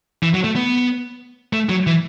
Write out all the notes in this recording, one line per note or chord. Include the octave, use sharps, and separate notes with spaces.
E3
F#3
A3
B3
A3
F#3
E3